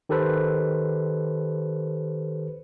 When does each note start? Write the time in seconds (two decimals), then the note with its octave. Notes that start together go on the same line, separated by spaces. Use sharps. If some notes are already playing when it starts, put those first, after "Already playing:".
0.09 D#3 G4 A4 B4 C5